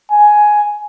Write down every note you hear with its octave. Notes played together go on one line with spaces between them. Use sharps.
G#5